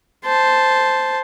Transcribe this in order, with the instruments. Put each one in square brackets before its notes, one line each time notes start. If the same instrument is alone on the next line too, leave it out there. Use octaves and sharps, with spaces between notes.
[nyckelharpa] C5 A5